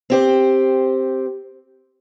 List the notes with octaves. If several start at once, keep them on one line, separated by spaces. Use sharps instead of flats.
C4 G4 C5